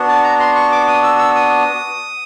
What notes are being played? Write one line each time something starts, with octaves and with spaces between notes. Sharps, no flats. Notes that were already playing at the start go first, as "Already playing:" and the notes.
Already playing: B3 D4 F#4
A5
A#5
C6
C#6
D6
D#6
E6
E6
D#6